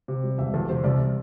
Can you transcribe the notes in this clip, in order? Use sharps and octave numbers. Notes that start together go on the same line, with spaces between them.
C3
G3
E1 E5
E2 A4
C3 C5
C2 D5